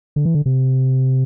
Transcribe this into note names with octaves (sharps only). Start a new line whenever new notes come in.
D3
E3
D3
C3